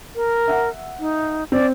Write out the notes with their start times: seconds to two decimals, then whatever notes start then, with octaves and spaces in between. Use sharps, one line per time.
0.16 A#4
0.48 E5 F#5
1.00 D#4
1.52 C4 D5